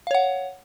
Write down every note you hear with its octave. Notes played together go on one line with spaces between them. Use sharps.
C#5 F5 F#5